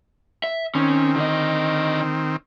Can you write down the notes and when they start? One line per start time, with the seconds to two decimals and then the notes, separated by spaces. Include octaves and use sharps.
0.44 E5
0.75 D#3 C4 C#4
1.16 D3 D#5